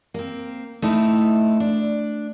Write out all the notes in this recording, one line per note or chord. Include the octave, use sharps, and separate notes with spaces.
A#3 C4
A3 C4 D#4 E4
D4